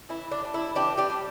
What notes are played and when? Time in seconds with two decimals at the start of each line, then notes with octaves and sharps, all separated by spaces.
0.09 E3 E4
0.31 D4
0.42 G3 D4
0.54 E4
0.75 E3 D4 G4
0.97 D4 G4
1.10 G3 D4